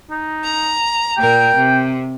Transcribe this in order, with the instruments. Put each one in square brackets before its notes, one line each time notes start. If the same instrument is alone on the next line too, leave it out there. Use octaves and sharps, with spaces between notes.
[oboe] D#4
[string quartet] A#5
[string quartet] A#2 A#4 [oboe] G5
[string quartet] C3